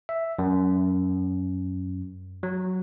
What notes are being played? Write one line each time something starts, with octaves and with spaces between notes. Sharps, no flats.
E5
F#2
F#3